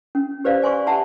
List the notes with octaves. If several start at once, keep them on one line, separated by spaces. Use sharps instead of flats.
C#4
G4 B4 C5 D5 F5
D5 G#5 C6 C#6
G4 E5 F#5 A5 B5